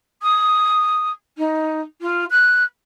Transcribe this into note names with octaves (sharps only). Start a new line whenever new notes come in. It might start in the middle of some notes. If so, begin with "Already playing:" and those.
D#6
D#4
F4
F#6